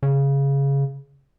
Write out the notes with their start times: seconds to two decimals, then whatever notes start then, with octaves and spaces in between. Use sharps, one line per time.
0.03 C#3